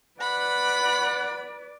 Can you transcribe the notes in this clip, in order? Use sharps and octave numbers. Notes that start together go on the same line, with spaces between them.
B4 D5 F#5 B5